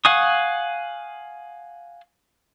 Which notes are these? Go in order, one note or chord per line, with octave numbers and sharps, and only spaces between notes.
F5 F#5 G#5 C#6 D#6